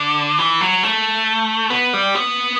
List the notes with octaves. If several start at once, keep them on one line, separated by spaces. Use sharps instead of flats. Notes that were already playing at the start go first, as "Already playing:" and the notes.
Already playing: D3
E3
F#3
A3
B3
G3
B3